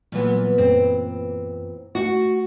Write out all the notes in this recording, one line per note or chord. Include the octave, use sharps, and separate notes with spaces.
A#2 E3 F#3 G3 B3
F#2 C4
A3 F#4 C#7